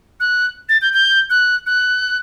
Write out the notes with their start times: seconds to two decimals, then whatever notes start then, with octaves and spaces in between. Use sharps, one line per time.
0.20 F#6
0.69 A6
0.82 G6
0.93 G6
1.30 F#6
1.66 F#6